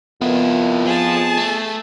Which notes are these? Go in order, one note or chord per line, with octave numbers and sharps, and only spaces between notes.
F2 A#3 B3 E4
F3 G#4 A5
A3